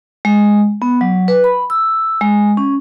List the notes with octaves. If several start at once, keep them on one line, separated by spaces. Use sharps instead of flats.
G#3
B3
F#3
B4
B5
E6
G#3
C#4